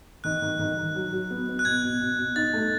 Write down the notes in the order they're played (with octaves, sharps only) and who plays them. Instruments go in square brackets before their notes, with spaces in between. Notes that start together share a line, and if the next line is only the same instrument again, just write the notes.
[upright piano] D#3 [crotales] F#6
[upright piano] D#3
D#3
D#3
F#3
F#3
B3
B3
[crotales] F#6
[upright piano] B2 [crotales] G#6
[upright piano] B2
B2
B2
[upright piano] D#4 [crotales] A6
[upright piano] A3